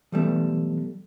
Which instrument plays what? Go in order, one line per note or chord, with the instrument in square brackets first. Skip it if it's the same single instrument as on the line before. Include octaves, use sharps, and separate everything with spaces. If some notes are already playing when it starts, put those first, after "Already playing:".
[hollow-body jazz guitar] B1 G3 A3 [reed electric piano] E3 B3